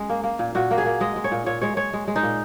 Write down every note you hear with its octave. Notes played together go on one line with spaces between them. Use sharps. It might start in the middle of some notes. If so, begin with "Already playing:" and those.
Already playing: G#3 C#4
A#3
A#3
A#2
A#2 F#4
A#3
G#4
A#3
G#3 D#5
G#3
C#5
A#2
A#2 C#5
G#3 C#5
G#3 C#5
G#3
G#3
D#4
A#2